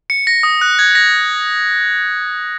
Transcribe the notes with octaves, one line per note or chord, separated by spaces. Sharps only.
C#7
A#6
D#6
F#6
G#6
A#6